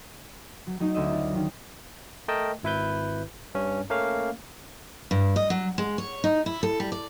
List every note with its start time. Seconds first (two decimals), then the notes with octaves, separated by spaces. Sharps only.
0.67 F#3
0.80 F#3 A3 D#4
0.94 D2 A3 C#4 D#5 E5 E6
1.09 F4 A#4
1.32 D#3 F#3
2.28 A3 A#4 D#5 G5 A5
2.63 G#1 E4 B4 G6
3.55 G2 C#4
3.90 A3 A#3 C#4 F5
5.11 G2
5.36 D#5
5.50 F#3
5.78 G#3
5.98 C#5
6.24 D#4
6.46 E4
6.63 A4
6.80 G3
6.92 D5